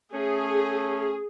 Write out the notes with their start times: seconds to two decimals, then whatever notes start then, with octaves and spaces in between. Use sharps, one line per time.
0.13 A3 C#4 G#4